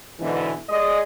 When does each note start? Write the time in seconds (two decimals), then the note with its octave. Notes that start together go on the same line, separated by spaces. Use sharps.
0.20 G#2 B2 D3 E3
0.69 G#3 G#4 D5 D#5